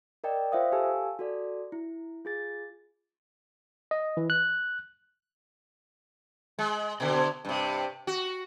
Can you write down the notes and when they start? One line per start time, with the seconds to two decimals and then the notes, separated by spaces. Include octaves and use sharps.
0.24 A#4 D5 D#5 G5
0.52 F4 C5 E5 F5 D#6
0.72 G4 A4 F5 G#5 A5 E6
1.19 F#4 A4 D5
1.72 E4
2.25 F4 G#4 A6
3.91 D#5
4.17 E3
4.30 F#6
6.59 G#3
7.00 B2 D3
7.45 G2 C3
8.07 F#4